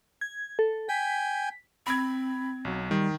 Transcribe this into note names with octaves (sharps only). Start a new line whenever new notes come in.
G#6
A4
G5 G#5 B6
C4 B5 G#6
B1 F#3
D#3 G3